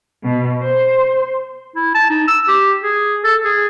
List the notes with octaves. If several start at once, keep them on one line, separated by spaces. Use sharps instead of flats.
B2
C5
E4
A5
D#4
E6
G4
G#4
A4
G#4